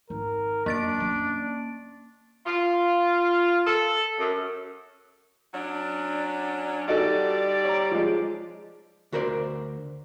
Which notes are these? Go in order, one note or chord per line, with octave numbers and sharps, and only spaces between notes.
G#1 A#4
F#2 D3 A#3 D4 A6 D7
C#4
F4
A4
F#2
F#3 C#4 D4
D3 G3 D#4 F#4 A4 D5
C#5 A#5
F3 G#3
D2 F#4 A#4 C5 D5